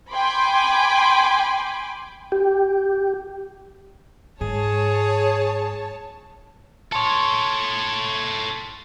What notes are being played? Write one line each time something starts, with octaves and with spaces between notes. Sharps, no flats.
G5 G#5 B5 C6 D6
G4
G#2 G#4 C#5 A5
A4 C#5 A5 C6 C#6